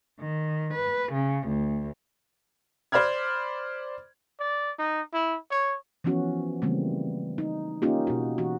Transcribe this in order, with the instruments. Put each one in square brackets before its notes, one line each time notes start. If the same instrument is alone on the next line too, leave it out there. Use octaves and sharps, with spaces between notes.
[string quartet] D#3
B4
C#3
D2
[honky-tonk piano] C5 D5 B5 F6 G#6
[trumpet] D5
D#4
E4
C#5
[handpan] E3 F3 B3 C#4 F#4
C#3 E3 G3 A3 A#3 C4
D#4
A#3 C#4 D#4 F4 G4
B2 F#4
E3 F#4